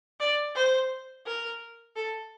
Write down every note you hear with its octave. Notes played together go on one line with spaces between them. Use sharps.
D5
C5
A#4
A4